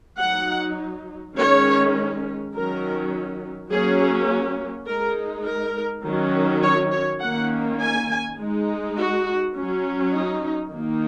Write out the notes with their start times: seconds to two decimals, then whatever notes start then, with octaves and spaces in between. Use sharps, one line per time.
0.20 F#3 D#4 F#5
1.36 D#3 G#3 C#4 C#5
2.53 D#3 F#3 C#4 A#4
3.70 F#3 A#3 C#4 G#4
4.87 G#3 D#4 A#4
5.45 A#4
6.04 D#3 F#3 C#4
6.63 C#5
6.92 C#5
7.20 D#3 A#3 C#4 F#5
7.79 G#5
8.38 G#3 D#4
8.96 F#4
9.54 F#3 C#4
10.13 D#4
10.71 D#3 A#3 D#4